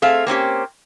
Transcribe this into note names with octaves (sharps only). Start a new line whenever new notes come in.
A3 C4 G#4 F5
A#3 C4 C#4 G4